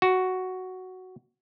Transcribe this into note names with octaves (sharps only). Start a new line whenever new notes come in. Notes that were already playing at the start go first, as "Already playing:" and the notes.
F#4